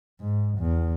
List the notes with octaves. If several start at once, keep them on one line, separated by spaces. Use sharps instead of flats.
G#2
E2